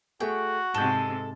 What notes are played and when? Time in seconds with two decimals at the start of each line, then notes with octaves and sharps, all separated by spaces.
0.20 A3 F#4 G#4 G5
0.74 G#2 C3 A4 G6 E7